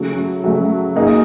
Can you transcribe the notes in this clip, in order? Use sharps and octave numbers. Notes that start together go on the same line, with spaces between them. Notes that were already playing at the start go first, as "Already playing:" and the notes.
Already playing: C#3 F#3 A3
C#3 F#3 A3
A#3 D#4 G#4